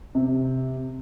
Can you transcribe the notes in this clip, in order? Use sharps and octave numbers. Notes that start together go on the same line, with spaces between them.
C3